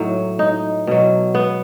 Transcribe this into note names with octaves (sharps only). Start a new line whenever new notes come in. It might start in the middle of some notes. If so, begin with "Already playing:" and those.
Already playing: A2 F#3 D#4
D#4
B2 F#3
B3